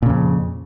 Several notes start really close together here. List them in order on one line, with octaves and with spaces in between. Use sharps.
A#2 C#3 F2